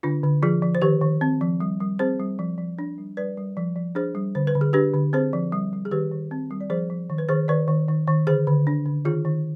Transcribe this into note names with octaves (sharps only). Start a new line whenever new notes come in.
D3 D4 F4
D3
F3 F4 G#4
F3
C5
D#3 G4 B4
D#3
C4
F3
G3
G3
C4 G#4 C5
G3
F3
F3
D4
G3
G3 B4 D5
G3
F3
F3
D4 G#4 C5
G3
D3 C5
B4
D3
G#4
D4 G4 B4
D3
C4 G#4 C5
F3
G3
G3
G#4
D#3 G4 B4
D#3
C4
G3
D5
F3 G#4 C5
F3
D#3
B4
D#3 G#4 C5
D#3 B4 D5
D#3
D#3
D#3
D3 G#4 C5
D3
D4
D3
D#3 F4 G#4
D#3